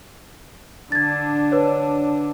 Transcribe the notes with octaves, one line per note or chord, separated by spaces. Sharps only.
D3 D4 G#6 A6
B4 C#5